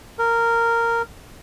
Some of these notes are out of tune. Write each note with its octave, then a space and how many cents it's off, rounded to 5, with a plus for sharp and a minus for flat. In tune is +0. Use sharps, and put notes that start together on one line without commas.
A#4 -10